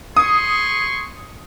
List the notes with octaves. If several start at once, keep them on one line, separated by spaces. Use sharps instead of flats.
G#4 C6 C#6 D#6